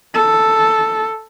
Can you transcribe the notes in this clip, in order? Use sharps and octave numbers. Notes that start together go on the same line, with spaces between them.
A4